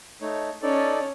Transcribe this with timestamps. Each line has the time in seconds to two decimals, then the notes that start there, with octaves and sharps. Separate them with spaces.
0.21 A3 D#4 C#5
0.62 C#4 D#4 A4 D5